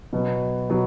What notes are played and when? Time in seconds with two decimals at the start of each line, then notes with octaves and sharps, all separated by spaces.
0.13 B2 F#3 B3
0.70 B2 F#3 B3